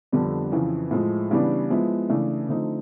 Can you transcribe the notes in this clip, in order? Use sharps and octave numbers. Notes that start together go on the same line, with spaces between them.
F2 D3 G3 B3 D4
F2 C#3 E3
A2 F3 G#3
C#3 E3 G3 B3 D4
F3 G#3 B3 E4
C#3 E3 A3 D4
D3 F3 A3 C4 D#4